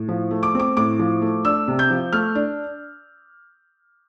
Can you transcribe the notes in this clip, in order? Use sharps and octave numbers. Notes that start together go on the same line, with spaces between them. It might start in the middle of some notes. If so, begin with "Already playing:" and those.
Already playing: A2
F3
A3
D6
C4 D6
A2 D6
F3
A3
D4 E6
C3
G6
F3
A3 F6
D4